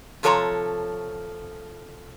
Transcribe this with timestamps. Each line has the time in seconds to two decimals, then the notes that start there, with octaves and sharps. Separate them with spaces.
0.23 C3 F3 A4 C#5 G#5 A#5